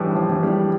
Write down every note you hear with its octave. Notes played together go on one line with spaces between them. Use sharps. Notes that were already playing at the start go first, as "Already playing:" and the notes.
Already playing: A2 E3 G3
F3
E3
G3